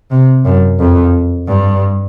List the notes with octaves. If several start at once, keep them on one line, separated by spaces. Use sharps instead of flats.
C3
F#2
F2
G2